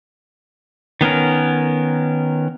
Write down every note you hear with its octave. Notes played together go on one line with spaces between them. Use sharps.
D#3 B3 C#4 A#4